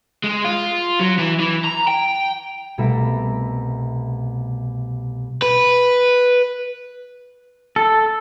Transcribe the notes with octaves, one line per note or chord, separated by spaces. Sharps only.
G#3
F4
F#3
E3
E3
A#5
G5
C2 B2 A3 A4 E5 A#5
B4
A4